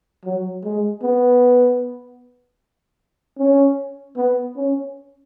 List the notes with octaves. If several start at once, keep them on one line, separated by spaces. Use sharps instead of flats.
F#3
G#3
B3
C#4
B3
C#4